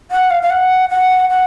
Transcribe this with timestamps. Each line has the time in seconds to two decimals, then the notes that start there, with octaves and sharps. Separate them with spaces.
0.11 F#5
0.31 F5
0.42 F5
0.50 F#5
0.90 F#5
1.30 F#5